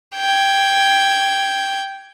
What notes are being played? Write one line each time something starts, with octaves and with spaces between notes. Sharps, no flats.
G5 G#6